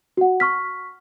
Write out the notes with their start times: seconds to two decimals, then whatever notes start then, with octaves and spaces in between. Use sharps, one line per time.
0.17 F#4 F#5
0.40 C#6 F6 B6